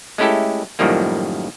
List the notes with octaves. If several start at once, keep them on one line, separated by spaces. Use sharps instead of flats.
G#3 A3 C#4 E4 G4 A4
F#2 A2 D#3 F3 G3 A#3